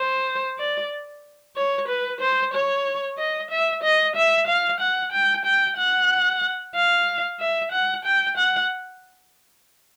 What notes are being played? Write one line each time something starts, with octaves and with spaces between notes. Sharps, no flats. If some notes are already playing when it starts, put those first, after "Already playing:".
Already playing: C5
D5
C#5
B4
C5
C#5
D#5
E5
D#5
E5
F5
F#5
G5
G5
F#5
F5
E5
F#5
G5
F#5